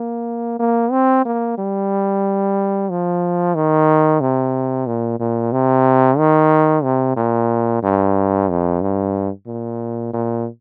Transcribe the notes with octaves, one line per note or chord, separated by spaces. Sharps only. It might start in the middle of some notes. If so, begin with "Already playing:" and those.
Already playing: A#3
A#3
C4
A#3
G3
F3
D#3
C3
A#2
A#2
C3
D#3
C3
A#2
G2
F2
G2
A#2
A#2